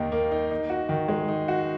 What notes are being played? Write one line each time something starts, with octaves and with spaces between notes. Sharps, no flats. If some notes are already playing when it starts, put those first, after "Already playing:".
Already playing: D#2 D#3 A#3 D#4
A#3
D#4
D#4
F#4
D#3
G#3
D#4
F#4